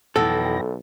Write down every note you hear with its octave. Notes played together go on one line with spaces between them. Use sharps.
B1 F2 B2 E3 A4 G5 A#6